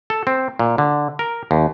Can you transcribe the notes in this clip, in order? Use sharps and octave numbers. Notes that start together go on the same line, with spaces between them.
A4
C4
A#2
D3
A#4
D#2